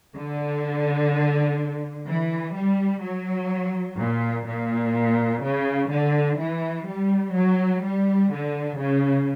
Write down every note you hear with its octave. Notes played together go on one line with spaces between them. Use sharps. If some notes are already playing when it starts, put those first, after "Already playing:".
D3
E3
G3
F#3
A#2
A#2
C#3
D3
E3
G3
F#3
G3
D3
C#3